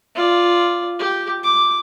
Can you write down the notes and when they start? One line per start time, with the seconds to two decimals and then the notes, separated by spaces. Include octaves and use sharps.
0.15 F4 D5
0.99 G4
1.43 D6